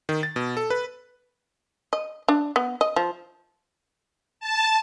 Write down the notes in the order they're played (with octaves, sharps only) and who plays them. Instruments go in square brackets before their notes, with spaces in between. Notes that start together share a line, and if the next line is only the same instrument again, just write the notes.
[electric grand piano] D#3
A6
B2
A4
B4
[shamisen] D#5
D4
B3
D#5
F3
[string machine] A5